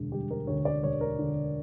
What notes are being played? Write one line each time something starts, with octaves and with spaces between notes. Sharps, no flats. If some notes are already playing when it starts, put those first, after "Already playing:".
Already playing: E1 D2 D3
G3 G4
A#4
D2 C#5
D5
E1 C#5
A#4
D3